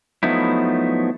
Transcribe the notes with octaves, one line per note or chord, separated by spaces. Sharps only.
F3 F#3 A3 B3 D#4 E4